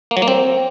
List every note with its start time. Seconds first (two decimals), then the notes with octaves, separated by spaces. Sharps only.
0.11 A#3
0.17 F#3
0.22 A#3
0.28 C4